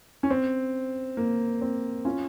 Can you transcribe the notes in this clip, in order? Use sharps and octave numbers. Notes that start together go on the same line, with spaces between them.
C#4
C4
A#3
C4
C#4 F4